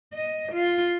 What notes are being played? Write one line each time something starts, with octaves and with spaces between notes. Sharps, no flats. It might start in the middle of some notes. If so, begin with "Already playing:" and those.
D#5
F4